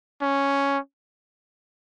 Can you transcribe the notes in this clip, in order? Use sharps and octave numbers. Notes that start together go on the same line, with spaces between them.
C#4